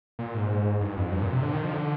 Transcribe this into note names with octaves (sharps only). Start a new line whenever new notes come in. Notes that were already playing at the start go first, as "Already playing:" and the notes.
A#2
G#2
G2
F2
G2
A#2
C3
D3
D#3
F3
D3